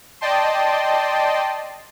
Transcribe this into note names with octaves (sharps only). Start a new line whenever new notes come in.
D5 D#5 G5 A5 C6